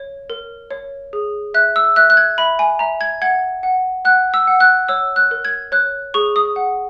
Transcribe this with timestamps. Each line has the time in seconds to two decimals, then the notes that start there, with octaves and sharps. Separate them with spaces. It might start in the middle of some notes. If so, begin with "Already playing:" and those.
Already playing: C#5
0.30 A#4
0.71 C#5
1.13 G#4
1.54 E5 F#6
1.76 E6
1.96 E5 F#6
2.10 F#6
2.17 G#6
2.38 E5 B5
2.59 G#5
2.79 E5 A#5
3.01 G#6
3.22 F#5 G#6
3.63 F#5
4.05 F#5 F#6
4.34 E6
4.47 F#5
4.60 F#6
4.89 C#5 E6
5.16 F#6
5.31 A#4
5.45 G#6
5.72 C#5 F#6
6.14 G#4 C#6
6.36 D#6
6.56 F#5